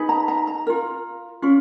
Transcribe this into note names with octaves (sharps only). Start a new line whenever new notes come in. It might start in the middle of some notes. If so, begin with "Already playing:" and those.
Already playing: D#4 G#4 B4
A#5
A#5
A#5
F4 A#4
C#4 F4